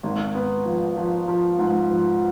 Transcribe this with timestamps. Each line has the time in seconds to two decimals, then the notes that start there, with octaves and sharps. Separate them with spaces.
0.03 G#1
0.35 B3
0.65 F3
0.96 F3
1.28 F3
1.59 G#2
1.91 F3